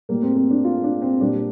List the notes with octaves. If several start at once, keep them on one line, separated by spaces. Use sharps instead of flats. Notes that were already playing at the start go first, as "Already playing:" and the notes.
A2 G3 A#3
C4
C4
D4
F4
D4
C4
A#2 G3 A#3 D4